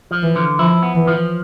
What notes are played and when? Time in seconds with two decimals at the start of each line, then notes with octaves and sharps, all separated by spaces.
0.11 F3
0.23 E3
0.36 D3
0.59 F3 E4
0.83 B3
0.95 E3
1.08 F3